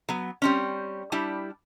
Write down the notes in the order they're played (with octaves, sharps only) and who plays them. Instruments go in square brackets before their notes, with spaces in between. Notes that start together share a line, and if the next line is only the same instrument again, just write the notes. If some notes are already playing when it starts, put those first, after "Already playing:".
[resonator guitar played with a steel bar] F#3 B3
G3 C4 C#4
G3 D4 E4 G4